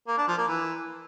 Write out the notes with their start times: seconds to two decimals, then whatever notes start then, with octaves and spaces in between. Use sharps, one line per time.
0.07 A#3
0.17 D4
0.27 F3
0.38 A#3
0.48 E3